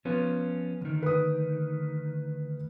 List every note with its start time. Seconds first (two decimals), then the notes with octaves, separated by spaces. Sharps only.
0.05 F3 B3 C#4 F4
0.81 D2 D#3
1.03 B4 D#6